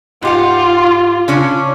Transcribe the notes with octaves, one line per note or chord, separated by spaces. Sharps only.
G#2 F4 G4 F#5
C#3 C#4 D4